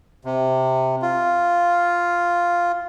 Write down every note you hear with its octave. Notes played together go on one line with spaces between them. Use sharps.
C3
F4